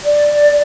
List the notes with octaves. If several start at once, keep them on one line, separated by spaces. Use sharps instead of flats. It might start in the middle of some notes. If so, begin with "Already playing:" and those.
D5